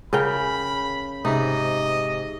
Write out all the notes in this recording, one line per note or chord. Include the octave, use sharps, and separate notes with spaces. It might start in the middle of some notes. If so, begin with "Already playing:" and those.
C#3 A#4 G5 B5
G#2 C3 D#4 D#5